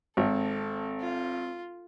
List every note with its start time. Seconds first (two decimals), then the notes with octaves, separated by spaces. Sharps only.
0.17 G#1 C4 A4
1.01 F4